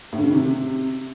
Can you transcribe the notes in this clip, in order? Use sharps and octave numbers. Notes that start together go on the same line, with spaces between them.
A2
D3
C#3
D#3
C3